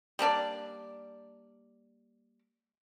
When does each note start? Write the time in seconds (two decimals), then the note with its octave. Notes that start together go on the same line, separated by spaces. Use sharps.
0.19 G3 A#3 D4 D5